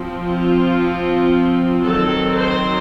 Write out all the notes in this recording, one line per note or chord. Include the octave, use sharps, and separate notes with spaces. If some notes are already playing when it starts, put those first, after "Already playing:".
Already playing: F3 C4
F4
D#3 F#3 C4 A4
C5